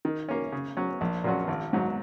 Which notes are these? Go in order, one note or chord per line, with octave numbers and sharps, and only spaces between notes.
D#3
A#3 C#4
C#3
F#3 C#4
A#1
A#2 F#3 C#4 F#4
G#1
G#2 F#3